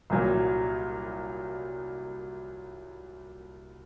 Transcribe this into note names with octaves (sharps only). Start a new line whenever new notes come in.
C2 A#2 F#3